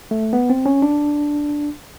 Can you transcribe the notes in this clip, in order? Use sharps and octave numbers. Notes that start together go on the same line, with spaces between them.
A3
B3
C4
C#4
D4